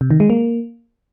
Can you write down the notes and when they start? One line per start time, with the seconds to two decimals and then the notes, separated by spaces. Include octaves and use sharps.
0.01 C3
0.11 D#3
0.20 G#3
0.30 A#3